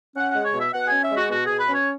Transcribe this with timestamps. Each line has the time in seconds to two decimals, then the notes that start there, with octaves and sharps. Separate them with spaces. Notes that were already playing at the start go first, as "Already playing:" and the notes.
0.15 C#4 F#5
0.30 G#3 F#5
0.44 C#5
0.54 B2 E5
0.73 B2 F#5
0.87 G#5
0.92 C#4
1.01 E5
1.11 G#3 F#4
1.30 B2 F#4
1.45 G#4
1.50 B2
1.59 B4
1.69 C#4 C#5